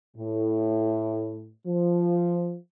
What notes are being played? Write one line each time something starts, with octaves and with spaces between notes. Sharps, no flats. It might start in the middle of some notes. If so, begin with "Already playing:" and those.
A2
F3